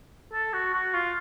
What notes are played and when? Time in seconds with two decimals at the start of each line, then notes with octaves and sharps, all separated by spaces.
0.33 A4
0.53 F#4
0.74 F#4
0.94 F4